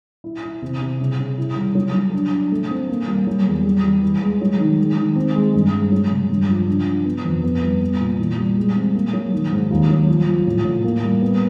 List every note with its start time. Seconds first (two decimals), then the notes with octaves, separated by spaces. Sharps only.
0.24 E4
0.43 E4
0.62 C3
0.81 C3
1.00 C#3
1.19 C#3
1.38 E4
1.56 G3
1.75 F#3
1.94 F#3
2.14 D4
2.33 D4
2.52 A3
2.71 C4
2.89 A#3
3.07 G3
3.26 F#3
3.46 E2
3.65 G3
3.83 G3
4.02 E3
4.22 G#3
4.41 F#3
4.59 D#3
4.79 G#3
4.97 D#3
5.16 C4
5.35 G#3
5.54 G2
5.73 G#3
5.92 F#3
6.11 C#3
6.30 G2
6.49 F3
6.68 D4
6.86 D4
7.05 B3
7.25 F2
7.44 B3
7.63 G3
7.81 B3
8.00 A#2
8.19 E3
8.38 G3
8.57 G#3
8.75 C4
8.94 A#3
9.13 F#3
9.33 D#3
9.51 G#2
9.71 D#2
9.89 F#3
10.08 F3
10.27 F3
10.47 A2
10.65 A2
10.84 A#3
11.03 G3
11.22 B3